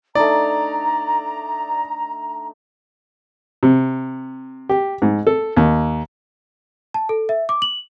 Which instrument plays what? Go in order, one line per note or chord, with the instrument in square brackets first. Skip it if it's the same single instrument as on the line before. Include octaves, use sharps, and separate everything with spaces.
[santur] A3 D4 D#4 [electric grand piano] D5 [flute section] A#5
[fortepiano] C3
G4
G#2
A4
D#2
[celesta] A5
A4
E5
D6
F#7